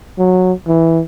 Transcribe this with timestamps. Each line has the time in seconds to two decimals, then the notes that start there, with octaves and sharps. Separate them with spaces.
0.18 F#3
0.68 E3